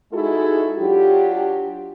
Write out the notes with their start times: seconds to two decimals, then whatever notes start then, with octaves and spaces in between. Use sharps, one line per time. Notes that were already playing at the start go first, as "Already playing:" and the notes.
0.13 G#3 D#4 E4 F#4 G#4 A4
0.78 F#3 D4 F4 G4